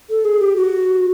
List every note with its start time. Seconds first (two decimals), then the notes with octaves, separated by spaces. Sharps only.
0.10 A4
0.25 G#4
0.41 G4
0.56 F#4